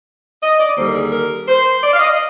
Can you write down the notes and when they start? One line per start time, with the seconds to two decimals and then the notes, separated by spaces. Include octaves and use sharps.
0.43 D#5
0.60 D5
0.77 D#2 D3 G3 C5
0.87 A#4
0.95 G#4
1.12 A#4
1.48 C5
1.83 D5
1.93 F5
1.99 D#5